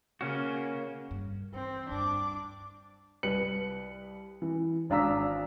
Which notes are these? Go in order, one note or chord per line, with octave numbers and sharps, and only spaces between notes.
C#3 A#3 C#4 F#4
G2
E3 C4
D2 G2 D4 D6
C2 B4 C#7 F#7
E3
G#1 D4 F5 A#5 E6 B6